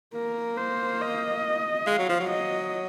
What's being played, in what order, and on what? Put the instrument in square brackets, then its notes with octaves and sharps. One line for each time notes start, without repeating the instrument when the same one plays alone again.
[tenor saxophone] A#3 [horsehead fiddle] A#4
[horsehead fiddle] C5
D#5
[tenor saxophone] G#3 [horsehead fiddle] F5
[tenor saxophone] F#3
F3
F#3
[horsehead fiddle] D#5